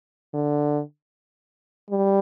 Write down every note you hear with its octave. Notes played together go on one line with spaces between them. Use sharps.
D3
G3